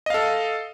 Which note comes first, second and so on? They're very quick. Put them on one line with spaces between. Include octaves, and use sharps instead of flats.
D#5 F5 A4